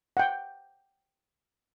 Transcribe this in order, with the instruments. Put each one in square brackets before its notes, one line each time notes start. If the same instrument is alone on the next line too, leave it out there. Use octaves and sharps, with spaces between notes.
[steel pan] F#5 G5